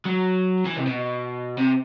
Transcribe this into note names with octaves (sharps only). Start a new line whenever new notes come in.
F#3
E3
C3
B2
C3